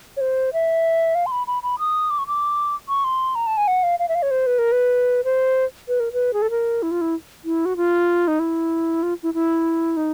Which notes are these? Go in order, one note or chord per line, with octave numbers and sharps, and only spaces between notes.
C#5
C5
E5
F5
C6
B5
B5
B5
D#6
D6
C#6
D6
C#6
C6
A#5
A5
G#5
F#5
F5
F5
E5
F5
C#5
C5
B4
A#4
B4
C5
B4
A#4
B4
G#4
A4
A#4
E4
F4
E4
E4
F#4
F4
D#4
E4
F4
E4
E4
D#4